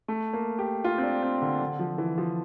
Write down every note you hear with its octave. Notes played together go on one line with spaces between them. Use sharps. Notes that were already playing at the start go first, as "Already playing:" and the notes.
A3
A#3
G4
F4
C4
D4
C4
D3
D3
F3
E3
F3